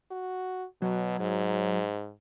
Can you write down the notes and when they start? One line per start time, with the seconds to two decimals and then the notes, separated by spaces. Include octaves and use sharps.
0.11 F#4
0.82 B2 F#3
1.20 G#2